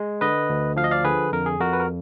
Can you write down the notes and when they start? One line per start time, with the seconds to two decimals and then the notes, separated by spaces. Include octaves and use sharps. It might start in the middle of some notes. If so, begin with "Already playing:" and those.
Already playing: G#3
0.21 D3 B4 D#5
0.49 D2
0.76 F3 F5
0.84 D#5
0.91 D5 F5
1.04 D3 G#4 B4
1.32 F2 A#4
1.46 G#4
1.60 F2 F#4 A#4
1.73 B4
1.80 A#4